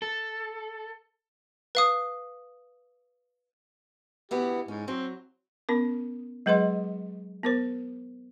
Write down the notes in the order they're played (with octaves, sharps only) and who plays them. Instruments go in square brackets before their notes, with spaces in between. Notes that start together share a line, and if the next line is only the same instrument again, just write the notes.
[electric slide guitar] A4
[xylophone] B4 F5 D#6
[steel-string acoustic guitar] D2 E3 B3 [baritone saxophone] G4
[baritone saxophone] G#2 [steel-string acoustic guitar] C#4
[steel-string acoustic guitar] F#3 [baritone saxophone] C4
[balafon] B3 C#4 A#4
F#3 G#3 G#4 B4 D#5 C6
B3 A#4 C5